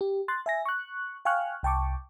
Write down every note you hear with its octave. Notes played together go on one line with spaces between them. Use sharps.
G4
C6 F#6 A6
E5 G#5 A#6
C#6 F#6
F5 G5 G#5 C#6 F6 F#6
C2 G5 A5 C#6 D6